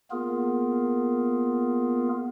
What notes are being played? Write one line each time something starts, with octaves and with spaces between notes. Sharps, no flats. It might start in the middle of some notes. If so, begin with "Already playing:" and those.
A#3 B3 F4 G#4 A#4